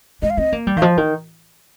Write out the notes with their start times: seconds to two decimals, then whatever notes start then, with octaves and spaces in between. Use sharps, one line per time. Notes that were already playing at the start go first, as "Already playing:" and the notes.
0.22 G#3 D#5
0.30 F5
0.37 C4 D#5
0.53 A#3
0.67 G3
0.77 D#3 F5
0.82 F3 D#5
0.97 D#3